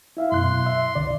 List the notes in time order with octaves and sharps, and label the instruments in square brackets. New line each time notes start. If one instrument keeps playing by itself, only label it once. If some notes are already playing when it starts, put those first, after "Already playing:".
[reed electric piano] E4 E5 F5
[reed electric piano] F#2 B2 F#6 [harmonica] C6
[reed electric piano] E5
C2 D3 D5